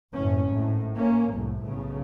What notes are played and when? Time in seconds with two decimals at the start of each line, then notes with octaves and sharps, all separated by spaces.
0.14 F#1 A2 C#4
0.49 G#1 A2
0.94 A#3 C#4
1.30 F1 C2 A2
1.60 B1 A2 C#3